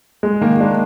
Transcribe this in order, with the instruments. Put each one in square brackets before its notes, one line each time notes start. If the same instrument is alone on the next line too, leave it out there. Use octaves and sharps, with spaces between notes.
[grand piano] G#3
[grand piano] D#3 [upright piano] A#3
[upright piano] G#3 [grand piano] D4